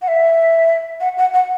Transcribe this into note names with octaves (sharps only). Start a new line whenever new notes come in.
F#5
E5
F#5
F#5
F#5